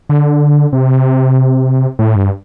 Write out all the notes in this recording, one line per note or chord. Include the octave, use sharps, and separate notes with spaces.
D3
C3
A2
G2